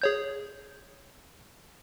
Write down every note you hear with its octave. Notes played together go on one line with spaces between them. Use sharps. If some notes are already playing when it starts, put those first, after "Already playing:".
G#4 C#5 G6